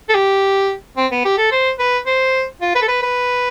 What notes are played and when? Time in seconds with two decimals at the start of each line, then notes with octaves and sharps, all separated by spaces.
0.09 A4
0.15 G4
0.97 C4
1.12 B3
1.25 G4
1.38 A4
1.52 C5
1.79 B4
2.06 C5
2.61 F4
2.75 B4
2.82 A4
2.89 B4
3.03 B4